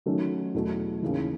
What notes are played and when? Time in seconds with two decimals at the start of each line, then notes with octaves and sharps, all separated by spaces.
0.06 D#3 F#3 A3 C#4
0.54 E2 B2 F#3 A3
1.02 D#2 C#3 E3